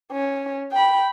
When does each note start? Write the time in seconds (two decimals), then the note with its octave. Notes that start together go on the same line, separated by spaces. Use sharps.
0.12 C#4
0.72 G5 B5